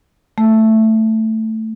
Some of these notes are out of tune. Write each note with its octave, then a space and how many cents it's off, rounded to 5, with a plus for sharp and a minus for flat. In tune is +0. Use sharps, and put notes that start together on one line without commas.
A3 +5